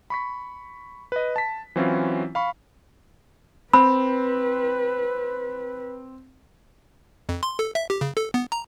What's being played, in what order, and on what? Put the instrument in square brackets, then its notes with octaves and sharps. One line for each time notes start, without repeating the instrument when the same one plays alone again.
[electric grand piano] B5 C#6 B6
B4 D#5
A5 B6
E3 F#3 C4 C#4 E4 F4
F5 B5 C#6
[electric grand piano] C4 [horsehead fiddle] B4 [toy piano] B5
[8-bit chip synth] F2
C6
A4
E5
G4
C#3
A4
B3
A#5